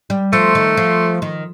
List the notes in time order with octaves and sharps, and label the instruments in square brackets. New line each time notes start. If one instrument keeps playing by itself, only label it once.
[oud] G3
[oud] F3 [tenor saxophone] A3
[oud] D#3
F3
D#3